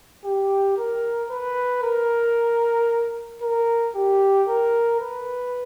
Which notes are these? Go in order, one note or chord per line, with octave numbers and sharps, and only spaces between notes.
G4
A#4
B4
A#4
A#4
G4
A#4
B4